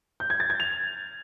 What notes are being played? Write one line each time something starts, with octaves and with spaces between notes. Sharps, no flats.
G6
G#6
A6
G#6
F7